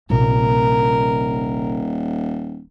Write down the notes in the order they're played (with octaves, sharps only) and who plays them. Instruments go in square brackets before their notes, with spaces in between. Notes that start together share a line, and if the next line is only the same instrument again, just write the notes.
[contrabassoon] D#1 [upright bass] A#1 C3 [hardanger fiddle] A#4